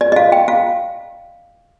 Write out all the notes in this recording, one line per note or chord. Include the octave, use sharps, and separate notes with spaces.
D5
D#5
F5
G5
F5